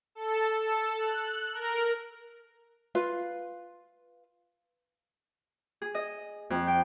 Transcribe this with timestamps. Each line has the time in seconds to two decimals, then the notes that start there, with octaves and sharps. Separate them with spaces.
0.15 A4
0.62 A4
0.98 F#6
1.53 A#4
2.95 F4 B4 F5
5.82 G#4
5.95 D#5
6.50 F2
6.67 G5